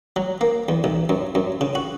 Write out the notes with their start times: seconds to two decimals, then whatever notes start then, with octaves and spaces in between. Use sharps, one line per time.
0.16 F#3
0.41 A#3
0.69 E2
0.84 B1
1.09 F#2
1.35 F#2
1.61 C#3
1.75 F#4